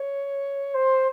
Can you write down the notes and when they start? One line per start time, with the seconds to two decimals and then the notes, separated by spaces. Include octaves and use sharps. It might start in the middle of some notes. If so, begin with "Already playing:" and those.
Already playing: C#5
0.74 C5